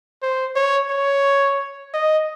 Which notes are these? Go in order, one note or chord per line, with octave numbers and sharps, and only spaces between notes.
C5
C#5
C#5
D#5